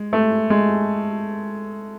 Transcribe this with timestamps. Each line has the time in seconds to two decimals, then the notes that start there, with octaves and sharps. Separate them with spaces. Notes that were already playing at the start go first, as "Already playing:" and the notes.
Already playing: G#3
0.13 A3
0.50 G#3